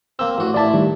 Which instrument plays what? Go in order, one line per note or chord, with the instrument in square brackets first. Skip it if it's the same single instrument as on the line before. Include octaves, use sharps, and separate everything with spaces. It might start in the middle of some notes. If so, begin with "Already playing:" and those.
[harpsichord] A#3 C4 [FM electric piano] E6
[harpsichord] A1 F#4
[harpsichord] A1 E4 E5 [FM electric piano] D5 A5
[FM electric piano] D#3 G3